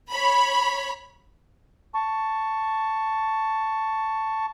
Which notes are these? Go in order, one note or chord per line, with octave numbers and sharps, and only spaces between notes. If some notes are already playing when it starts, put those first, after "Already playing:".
C#5 B5
A5 C#6